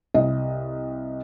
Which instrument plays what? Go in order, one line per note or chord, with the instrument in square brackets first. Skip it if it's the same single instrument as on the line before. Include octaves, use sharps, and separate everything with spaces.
[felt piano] C2 D#5